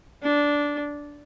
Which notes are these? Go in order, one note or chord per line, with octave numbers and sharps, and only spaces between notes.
D4